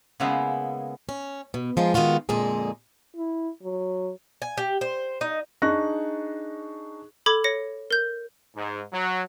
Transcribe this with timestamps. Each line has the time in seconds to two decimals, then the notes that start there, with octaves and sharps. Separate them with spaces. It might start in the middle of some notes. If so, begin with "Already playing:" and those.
0.20 C#3 G#3 A#3 B3 E4
1.09 C#4
1.54 B2
1.77 F3 G#3 D#4 F4
1.94 D#3 G#3 B3 F4 F#4
2.29 F2 A#2 D3 G#3 G#4
3.16 E4
3.63 F#3
4.42 G#5
4.58 G4
4.81 C5
5.21 D#4
5.62 D4 D#4 G#4 C#6 F#6 A#6
7.26 A4 B5 D6 G#6
7.44 C#5 A#6 C#7
7.91 A#4 G6
8.55 G#2
8.93 F#3